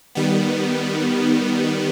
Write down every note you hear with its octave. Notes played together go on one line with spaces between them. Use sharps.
D#3 G3 B3